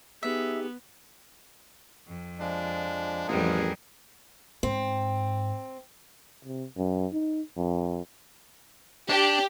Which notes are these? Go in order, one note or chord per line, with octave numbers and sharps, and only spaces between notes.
B3 D#4 G4 G#4 E5
F2
F3 G#3 D4
A1 F2 G3 G#4 A#4 F#5
G#2 C4
C3
F#2
D#4
F2
D4 G4